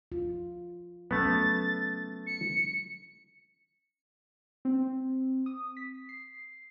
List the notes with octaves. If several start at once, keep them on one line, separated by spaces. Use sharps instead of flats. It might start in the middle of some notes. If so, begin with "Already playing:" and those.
F4
F#3 A3 B3 C#4 A6
C#7
C4
D#6
B6
C7